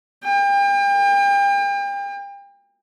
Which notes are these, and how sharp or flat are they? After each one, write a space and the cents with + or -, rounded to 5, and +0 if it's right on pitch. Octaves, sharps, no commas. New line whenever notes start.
G5 +35